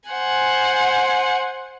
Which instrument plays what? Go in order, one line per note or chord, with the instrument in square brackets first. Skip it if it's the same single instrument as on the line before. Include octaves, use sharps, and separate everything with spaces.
[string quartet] C5 F#5 G#5